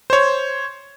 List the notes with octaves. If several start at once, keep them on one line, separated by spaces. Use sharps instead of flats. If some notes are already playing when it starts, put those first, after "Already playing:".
C5 C#5